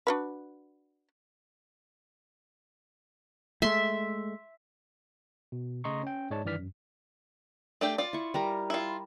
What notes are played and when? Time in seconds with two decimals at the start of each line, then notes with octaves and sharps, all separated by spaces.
0.07 D4 F#4 B4
3.62 G#3 A3 E5 C6
5.52 B2
5.84 C#3 A3 D#5 A#5 C6 C#6
6.03 C#4 G5
6.30 G#2 G#3 C#5 D5 A5
6.45 G2 D#3 E3 D5 F6 B6
6.58 F#2
7.81 A3 D4 G4
7.98 F4 D5
8.13 E4 C#6
8.34 G3 A#4 A#5
8.70 E4 F4